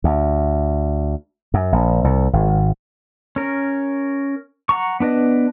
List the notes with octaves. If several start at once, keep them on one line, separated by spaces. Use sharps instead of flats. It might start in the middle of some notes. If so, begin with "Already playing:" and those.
D2
F#2
A#1
C2
G#1
C#4 A#4
F#5 A#5 C#6
B3 D4 B4 D#5